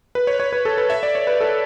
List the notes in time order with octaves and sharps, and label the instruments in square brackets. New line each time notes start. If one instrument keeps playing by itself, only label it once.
[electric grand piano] B4
C#5
C#5
B4
A4
B4
E5
D5
C#5
B4
A4